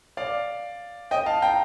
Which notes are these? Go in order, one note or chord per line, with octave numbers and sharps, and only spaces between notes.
D5 F5
D#5 G5
F5 A5
G5 A#5